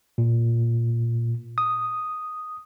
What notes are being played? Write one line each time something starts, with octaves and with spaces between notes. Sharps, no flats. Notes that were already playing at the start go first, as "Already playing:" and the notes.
A#2
D#6